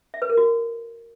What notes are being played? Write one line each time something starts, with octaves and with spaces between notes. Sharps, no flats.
E5
B4
A#4
F#4